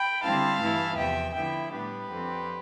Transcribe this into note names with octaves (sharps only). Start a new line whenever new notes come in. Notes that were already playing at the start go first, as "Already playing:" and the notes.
Already playing: G5 B5
D3 G3 C4 E4 F5 A5
G2 E3 A3 E4
E2 C3 F3 B3 E5 G5
D3 F3 B3 E4 E5 G5
A2 G3 B3 D4 G4 B4
F2 D3 F3 C4